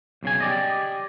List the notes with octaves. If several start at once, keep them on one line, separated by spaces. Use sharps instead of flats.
B1 C#3 G#5
G4 D5 D#5